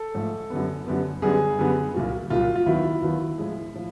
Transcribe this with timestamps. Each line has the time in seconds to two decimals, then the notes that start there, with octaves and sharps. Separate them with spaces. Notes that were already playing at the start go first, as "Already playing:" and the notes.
Already playing: A4
0.15 G#2 F3 A3
0.50 F#2 D3 G3 B3
0.86 F#2 D3 G3 B3
1.22 F#2 D3 G3 B3 G#4
1.59 F#2 D3 G3 B3
1.94 C2 A#2 F#3
2.30 C2 A#2 F#3 F4
2.55 F4
2.66 D#2 D#3 F#3 B3 E4
3.02 D#2 D#3 F#3 B3
3.38 A2 F3 G#3
3.74 A2 F3